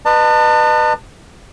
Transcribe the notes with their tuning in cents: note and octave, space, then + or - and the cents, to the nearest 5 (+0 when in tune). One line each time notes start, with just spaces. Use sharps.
B4 -5 D#5 -35 A5 +35